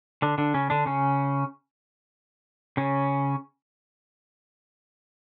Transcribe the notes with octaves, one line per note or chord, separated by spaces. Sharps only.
D3 D4
D3 D4
C#3 C#4
D3 D4
C#3 C#4
C#3 C#4